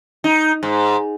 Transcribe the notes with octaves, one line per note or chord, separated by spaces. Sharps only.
D#4
G#2